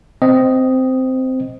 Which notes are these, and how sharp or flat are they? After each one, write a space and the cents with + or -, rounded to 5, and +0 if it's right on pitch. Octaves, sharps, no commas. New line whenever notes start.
C4 -10 D#5 +0